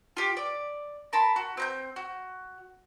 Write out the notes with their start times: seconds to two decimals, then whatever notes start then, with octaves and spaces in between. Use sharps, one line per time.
0.17 F4 G4
0.37 D5
1.13 A#4 A5 B5 C6
1.36 F#4
1.57 C4 A#5 G6
1.96 F#4